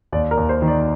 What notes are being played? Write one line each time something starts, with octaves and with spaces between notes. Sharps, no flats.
D#2 D5
A#4
D#2
C5
D#3
D5